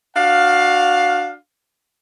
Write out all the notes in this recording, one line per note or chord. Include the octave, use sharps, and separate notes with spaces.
D4 F#4 F5